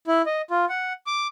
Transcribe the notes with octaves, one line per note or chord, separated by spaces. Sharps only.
E4
D#5
F4
F#5
D6